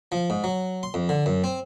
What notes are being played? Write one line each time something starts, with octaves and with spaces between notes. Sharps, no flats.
F3
G#2
F#3
C6
F2
D3
F#2
C4